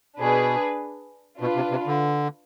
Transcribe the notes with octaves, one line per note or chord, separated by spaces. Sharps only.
B2 D4 G#4 B4
B2 D4 F4 B4
C3
C3
D3